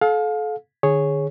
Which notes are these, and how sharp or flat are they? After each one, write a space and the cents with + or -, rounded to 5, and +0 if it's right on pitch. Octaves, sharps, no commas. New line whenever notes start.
A4 -35 F5 +30
D3 +40 G#4 +0 C#5 +0